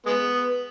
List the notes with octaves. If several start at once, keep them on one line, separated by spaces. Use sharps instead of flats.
G#3 B3